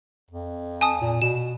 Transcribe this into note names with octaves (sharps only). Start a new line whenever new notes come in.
F2
G#5 A5 D#6
A#2
B2 E7